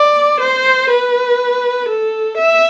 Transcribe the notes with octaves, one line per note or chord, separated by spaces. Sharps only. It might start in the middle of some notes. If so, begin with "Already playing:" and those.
Already playing: D5
C5
B4
A4
E5